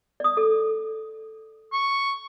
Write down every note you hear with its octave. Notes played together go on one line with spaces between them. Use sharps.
D5 D#6
A4
C#6